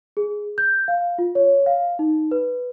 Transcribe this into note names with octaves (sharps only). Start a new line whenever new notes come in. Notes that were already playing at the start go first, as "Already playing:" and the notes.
G#4
G6
F5
F4
C#5
F5
D#4
B4